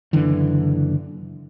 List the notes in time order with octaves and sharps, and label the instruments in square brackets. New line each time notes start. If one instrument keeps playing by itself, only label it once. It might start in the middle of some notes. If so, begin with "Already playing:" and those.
[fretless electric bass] F#1 D3 E3